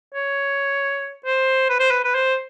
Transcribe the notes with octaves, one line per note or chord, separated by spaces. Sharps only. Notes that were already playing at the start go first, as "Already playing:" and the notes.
C#5
C5
B4
C5
B4
B4
C5